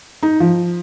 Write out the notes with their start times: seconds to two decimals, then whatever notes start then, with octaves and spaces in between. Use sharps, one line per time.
0.23 D#4
0.40 F3